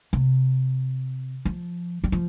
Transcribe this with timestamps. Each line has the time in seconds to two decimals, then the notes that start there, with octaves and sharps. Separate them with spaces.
0.13 C3
1.45 F3
2.04 G3
2.12 F3